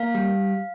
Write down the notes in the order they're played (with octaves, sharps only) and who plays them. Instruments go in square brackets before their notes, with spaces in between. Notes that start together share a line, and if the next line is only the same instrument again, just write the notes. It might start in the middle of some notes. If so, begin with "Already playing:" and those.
Already playing: [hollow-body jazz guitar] A#3 [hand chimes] F5
[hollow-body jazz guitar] G3